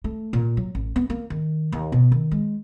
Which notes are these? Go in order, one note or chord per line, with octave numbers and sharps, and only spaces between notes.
A3
A#2
F#3
A1
B3
A#3
D#3
D#2
B2
D#3
G#3